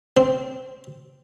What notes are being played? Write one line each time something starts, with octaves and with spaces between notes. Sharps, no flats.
C4